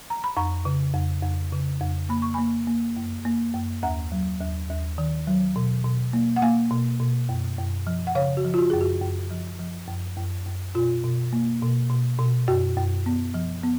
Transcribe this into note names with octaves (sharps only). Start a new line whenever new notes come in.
A#5
B5
F2 A#5 C#6
C#3
F2
F2
C#3
F2
A#3 B5
C#6
A#3 G#5 B5
A#3
F#2
A#3
F#2
D#2 F#5 A#5
F#3
D#2
D#2
D#3
F#3
B2
B2
A#3
F#5
A#3 F5 G#5
B2
B2
F#2
F#2
F3
F#5
C#3 C#5 F5
F#4
F3
F4
F#4
F#2 G#4
F#4
F#2
F3
F3
F#2
F#2
F#2
B2 F4
B2
A#3
B2
B2
B2
F#2 F#4
F#2
B3
F3
B3